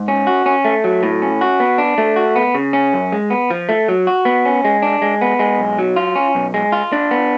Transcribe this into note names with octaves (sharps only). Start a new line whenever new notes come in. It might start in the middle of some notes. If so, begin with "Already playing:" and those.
Already playing: G#2
C#4
F#4
C#4
A3
F#3
A2
C#4
F#4
B3
D4
A3
F#4
B3
C#3
C#4
F#2
G#3
B3
F3
A3
F#3
F#4
B3
C#4
G#3
D4
G#3
B3
G#3
B1
F#3
F4
C#4
B1
G#3
F4
D4
B3